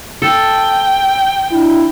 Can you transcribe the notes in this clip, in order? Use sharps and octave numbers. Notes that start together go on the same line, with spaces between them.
A4 G5
D4 E4